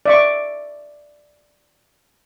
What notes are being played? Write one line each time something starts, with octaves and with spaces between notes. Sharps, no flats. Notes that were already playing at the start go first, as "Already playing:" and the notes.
D5 E5 C#6